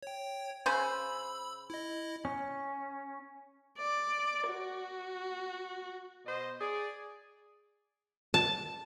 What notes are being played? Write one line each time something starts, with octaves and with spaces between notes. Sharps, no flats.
C#5 G5
C#3 C5 B5 E6
E4 D#5
C#4
D5
F#4
B2 C5 D#5
G#4 D5
A5